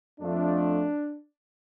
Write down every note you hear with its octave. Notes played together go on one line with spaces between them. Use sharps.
F2 F3 A3 D4